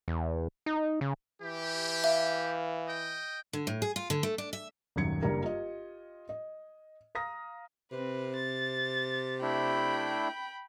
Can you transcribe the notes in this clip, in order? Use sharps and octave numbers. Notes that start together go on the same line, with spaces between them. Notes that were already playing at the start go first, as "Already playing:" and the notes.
E2
D#4
C#3
E3 G4
E5 F5
D#5 G5
D3
A2
G#4
F4
D3
A3
D4
E5
D#1 G#1 F#2 G#6 C#7
F#1 G2 G3 A#3 A#4 A#5
F4 G4 D#5
D#5
F5 A#5 D#6 A#6
C3 C4 B4
A6
A3 D4 E4 G5 B5